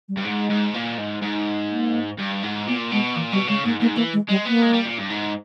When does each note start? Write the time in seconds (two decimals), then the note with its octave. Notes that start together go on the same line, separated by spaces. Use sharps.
0.09 G3
0.17 G2
0.24 G#2 G#3
0.49 G#2
0.74 A#2
0.98 G#2
1.22 G#2
1.70 A#3
2.18 G2
2.43 G#2
2.67 A#2 B3
2.92 B2 G#3
3.16 A#2 E3
3.32 B2 G3
3.48 C#3 G#3
3.65 G#2 A#3
3.80 G#2 A#3
3.96 E3 A#3
4.14 G#3
4.29 G3 G#3
4.46 A#3 B3
4.62 G#3
4.73 G3
4.86 A#2
4.98 G2
5.10 G#2